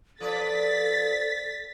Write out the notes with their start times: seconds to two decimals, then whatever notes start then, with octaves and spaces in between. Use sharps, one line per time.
0.20 F3 A4 B4 D5 A6 B6